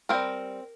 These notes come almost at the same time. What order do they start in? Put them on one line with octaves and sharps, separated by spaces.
A#3 C4 A#4 G3